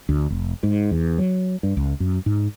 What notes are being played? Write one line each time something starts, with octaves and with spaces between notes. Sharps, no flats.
D2
F1
G#2
E2
F#3
G2
C#2
F#2
G#2